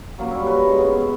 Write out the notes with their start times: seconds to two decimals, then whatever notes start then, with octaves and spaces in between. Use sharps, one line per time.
0.19 F#3 A#3 C#4
0.31 G3 C#5 E5
0.46 A#4 B4 C#5
0.65 C#3 G#3
0.78 B3 C#4
0.97 B3